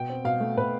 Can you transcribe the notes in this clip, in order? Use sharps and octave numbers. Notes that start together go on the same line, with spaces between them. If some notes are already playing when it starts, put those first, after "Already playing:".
Already playing: B2 G5
C4
B2 F5
A3
B2 B4